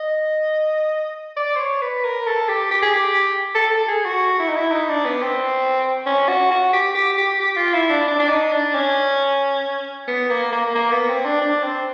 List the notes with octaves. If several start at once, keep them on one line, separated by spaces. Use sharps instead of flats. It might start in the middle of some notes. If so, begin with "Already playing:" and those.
Already playing: D#5
D5
C5
C#5
B4
A#4
A4
G4
G4
G#4
G4
A4
A4
G#4
F#4
E4
D#4
E4
D#4
D4
B3
C4
C#4
F#4
F#4
G4
G4
G4
G4
F4
E4
D4
D4
D4
D#4
D4
C#4
B3
A#3
A#3
A#3
B3
C4
D4
D4
C4